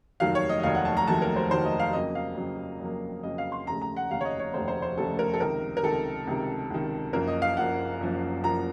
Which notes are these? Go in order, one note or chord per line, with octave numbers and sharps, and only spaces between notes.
F1 D#2 D#3 F#3 A3 F5
C#5
D#5
D#5
F1 D#2 D#3 F#3 A3 F5
F#5
A5
A#5
F1 D#2 D#3 F#3 A3 A5
A#4
C5
F1 D#2 D#3 F#3 A3 C5
D#5
F5
F2 C#3 F#3 A#3 D#5
F5
F2 C#3 F#3 A#3
F2 C#3 F#3 A#3
F2 C#3 F#3 A#3 D#5
F5
C6
F1 D#2 C#3 A3 A#5
A#5
F#5
F1 D#2 C#3 A3 F5
C#5
D#5
C#5
F1 D#2 C#3 A3 C5
C5
C5
F1 D#2 C#3 A3 A4
A#4
A4
C#2 C3 D#3 A#4
A#4
C#2 C3 D#3 A4
C#2 C3 D#3
C#2 C3 D#3
F#1 F#2 F3 A#3 A#4
D#5
F5
F#1 F#2 F3 A#3 F#5
F#1 F#2 F3 A#3
F#1 F#2 F3 A#3 A#5